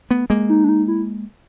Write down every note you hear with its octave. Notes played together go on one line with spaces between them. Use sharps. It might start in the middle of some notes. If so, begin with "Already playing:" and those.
A3 B3
G#3 A#3
D#4
D4
D#4
E4